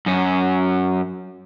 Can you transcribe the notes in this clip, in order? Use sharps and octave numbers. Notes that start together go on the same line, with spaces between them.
F#2 C#4